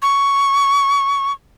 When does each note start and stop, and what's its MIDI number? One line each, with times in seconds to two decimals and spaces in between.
0.02 1.32 85